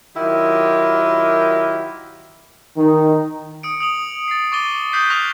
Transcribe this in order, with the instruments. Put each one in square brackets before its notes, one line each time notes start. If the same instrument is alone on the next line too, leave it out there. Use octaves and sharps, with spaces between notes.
[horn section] D#3 F#3 E4 F4 G4 A#4
[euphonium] D#3 [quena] D#4
[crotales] D#6 C#7 D7
D#6 F7 F#7
A6 C7
C#6 D6 A6 D#7 G7
D#6 F#6 G6 B6 C7 D#7
C#6 D#6 F6 F#6 A#6 F7